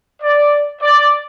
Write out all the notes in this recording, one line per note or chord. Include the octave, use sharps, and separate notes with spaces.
D5
D5